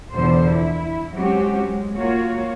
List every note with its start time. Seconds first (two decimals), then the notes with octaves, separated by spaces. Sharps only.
0.13 E2 B2 D3 F3 C5
0.51 E4
1.13 F#3 G#3 C4 C#4 F#4 G4
1.65 G#3
1.96 A#3 F4 F#4 C#5